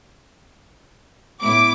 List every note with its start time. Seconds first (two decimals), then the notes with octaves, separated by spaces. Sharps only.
1.41 A2 B3 E4 D6